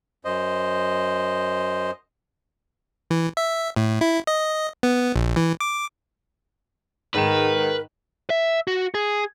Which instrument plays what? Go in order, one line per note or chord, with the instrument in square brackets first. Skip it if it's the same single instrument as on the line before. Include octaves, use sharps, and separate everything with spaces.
[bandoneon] F#2 C5 D#5
[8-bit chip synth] E3
E5
A2
E4
D#5
B3
A#1
E3
D6
[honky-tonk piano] G#2 E7 [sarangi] D#3 [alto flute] A#4 [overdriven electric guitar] B4
[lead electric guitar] E5
F#4
G#4